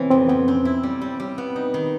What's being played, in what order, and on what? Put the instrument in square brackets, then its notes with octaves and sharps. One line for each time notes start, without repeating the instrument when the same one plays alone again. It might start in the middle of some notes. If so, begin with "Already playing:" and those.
Already playing: [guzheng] C#3 E3 [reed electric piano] B3 C4
[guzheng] F2 [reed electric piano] C4
[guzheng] F2 [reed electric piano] B3
[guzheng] C4 [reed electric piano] C#4
[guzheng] E4
G3
G3
G3
B3
D#4
D#3